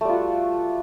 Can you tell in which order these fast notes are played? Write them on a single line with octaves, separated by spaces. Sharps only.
A3 G3 F4 F#4